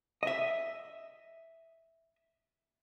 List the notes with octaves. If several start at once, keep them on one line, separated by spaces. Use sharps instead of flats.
D#5 E5